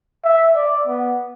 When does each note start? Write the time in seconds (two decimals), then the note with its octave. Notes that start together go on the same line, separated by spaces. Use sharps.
0.24 E5
0.56 D5
0.87 B3